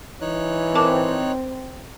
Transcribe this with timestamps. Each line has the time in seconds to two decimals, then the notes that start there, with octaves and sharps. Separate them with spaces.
0.21 E3 D#4 C#5 F#6
0.75 C4 A#4 A5 D6